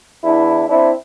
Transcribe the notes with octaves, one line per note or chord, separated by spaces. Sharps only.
E2 D4 E4
C4 D4 E4